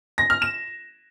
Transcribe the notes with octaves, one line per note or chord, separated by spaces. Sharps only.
A#6
F6
E7